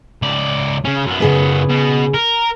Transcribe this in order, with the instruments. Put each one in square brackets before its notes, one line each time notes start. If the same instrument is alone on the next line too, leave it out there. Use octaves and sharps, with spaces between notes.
[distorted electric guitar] C#2 D5
C#3 C#4
F#2 B3
[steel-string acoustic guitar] C#3 G#4 B4
[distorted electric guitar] B2
A#4